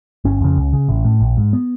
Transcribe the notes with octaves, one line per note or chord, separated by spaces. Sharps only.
G1 C#4
F2 C#3
C#2
C#3
A1
A2
A#1
G#2
B3